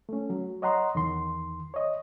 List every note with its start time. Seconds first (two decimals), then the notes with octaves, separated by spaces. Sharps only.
0.09 A3 C#4
0.30 F#3
0.62 C#5 D#5 F#5 A#5 C6
0.95 E2 D#3 C6
1.74 C#5 D#5